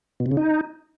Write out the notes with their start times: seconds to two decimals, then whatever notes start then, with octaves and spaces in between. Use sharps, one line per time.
0.20 B2
0.26 C3
0.31 C#3
0.37 D#4